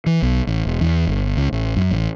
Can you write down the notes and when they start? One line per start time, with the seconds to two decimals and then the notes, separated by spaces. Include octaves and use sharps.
0.06 E3
0.22 B1
0.47 A1
0.65 E1
0.81 E2
1.07 G1
1.37 C#2
1.52 A1
1.77 F#2
1.91 A1